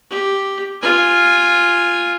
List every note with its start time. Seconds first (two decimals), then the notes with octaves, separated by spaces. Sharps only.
0.10 G4
0.82 F4 G#5